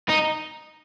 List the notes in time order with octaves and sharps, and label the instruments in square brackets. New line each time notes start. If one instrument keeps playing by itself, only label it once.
[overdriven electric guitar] D#4